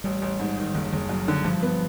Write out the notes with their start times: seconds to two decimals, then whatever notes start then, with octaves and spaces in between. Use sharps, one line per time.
0.04 A1 G3
0.22 A1
0.40 G#2
0.57 D#3
0.74 F#1
0.93 F#1
1.09 F#2
1.28 D3
1.45 G2 F3
1.62 B3